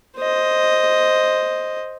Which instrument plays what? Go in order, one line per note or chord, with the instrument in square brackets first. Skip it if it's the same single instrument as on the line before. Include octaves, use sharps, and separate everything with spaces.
[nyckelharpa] C5 D#5